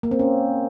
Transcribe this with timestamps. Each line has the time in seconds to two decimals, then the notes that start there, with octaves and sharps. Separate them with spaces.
0.03 A#3
0.11 C4
0.19 C#4